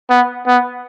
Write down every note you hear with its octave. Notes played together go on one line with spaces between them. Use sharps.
B3
B3